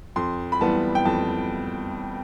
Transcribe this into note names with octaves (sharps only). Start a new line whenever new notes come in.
F2 C6
B5
E3 G3 B3 A5
G5
F2 A5